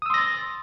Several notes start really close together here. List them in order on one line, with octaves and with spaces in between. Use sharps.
D#6 E6 C6 A#6 A6